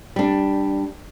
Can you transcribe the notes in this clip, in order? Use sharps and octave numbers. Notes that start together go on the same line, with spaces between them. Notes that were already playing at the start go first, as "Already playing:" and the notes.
G3 D4